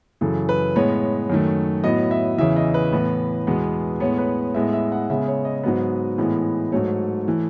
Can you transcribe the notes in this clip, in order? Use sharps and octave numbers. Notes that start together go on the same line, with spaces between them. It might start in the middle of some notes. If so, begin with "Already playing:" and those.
F#2 C#3 E3 A4
B4
A2 G#3 B3 C#5
F#2 D#3 A3
A2 F#3 B3 D#5
E5
E2 C#3 E3 E5
D#5
B4
A2 E3 B3
E2 B2 G#3 B3
A2 G#3 B3 C#5
B4
A2 G#3 B3 E5
E5
F#5
C#3 G#3 B3 E5
C#5
D#5
G#2 F#3 B3
A2 E3 G#3 B3
G#2 F#3 A3 C#5
E3 A3